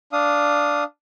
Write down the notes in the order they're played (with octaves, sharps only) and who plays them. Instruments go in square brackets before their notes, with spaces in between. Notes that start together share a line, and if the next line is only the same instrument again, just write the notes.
[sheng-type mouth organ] D4 F5 D#6